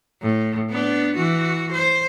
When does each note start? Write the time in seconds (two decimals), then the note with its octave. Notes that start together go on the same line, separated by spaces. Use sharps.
0.22 A2
0.70 B3 D4
1.15 E3 F#4
1.72 C5